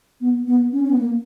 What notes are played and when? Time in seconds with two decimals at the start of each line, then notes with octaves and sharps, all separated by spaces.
0.21 B3
0.47 B3
0.72 C#4
0.84 C#4
0.91 B3
0.99 A#3